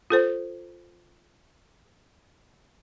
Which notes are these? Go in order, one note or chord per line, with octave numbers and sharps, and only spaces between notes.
F4 A4 C5